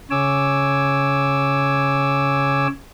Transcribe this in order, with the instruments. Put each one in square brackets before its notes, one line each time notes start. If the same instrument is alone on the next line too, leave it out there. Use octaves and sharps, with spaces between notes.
[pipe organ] C#3 C#5 G#5 D6 E6